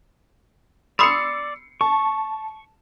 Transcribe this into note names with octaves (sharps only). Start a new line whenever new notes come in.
D5 B5 C6 D#6 E6 C7 C#7
A5 C#6